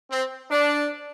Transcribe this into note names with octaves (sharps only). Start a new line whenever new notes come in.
C4
D4